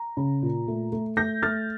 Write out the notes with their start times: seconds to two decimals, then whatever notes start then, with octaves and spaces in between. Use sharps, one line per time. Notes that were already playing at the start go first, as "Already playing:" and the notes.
Already playing: A#5
0.17 C#3
0.42 A#2
0.68 A3
0.92 A3
1.17 A3 G6 A#6
1.43 A3 F6 A6